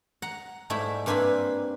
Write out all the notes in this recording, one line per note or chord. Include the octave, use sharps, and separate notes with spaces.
F#5 A#5
G#2 G3 A3 E4 B5
G2 A#3 C4 D4 G#5 B5